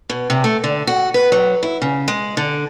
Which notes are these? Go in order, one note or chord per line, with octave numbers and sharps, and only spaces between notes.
B2
C3
A3
D3
F#4
B4
F#3
E4
C#3
G#3
D3